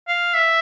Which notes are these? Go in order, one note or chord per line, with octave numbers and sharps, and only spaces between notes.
F5
E5